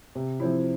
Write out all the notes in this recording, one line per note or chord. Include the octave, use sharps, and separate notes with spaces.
C3
F3 C4 E4